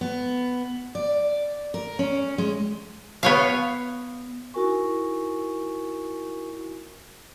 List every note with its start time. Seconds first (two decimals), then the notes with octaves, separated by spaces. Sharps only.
0.01 B3
0.95 D5
1.74 A#4
1.99 C#4
2.38 G#3
3.23 B3 C#5 F5
4.54 D#4 E4 F#4 A#4 G#5 C#6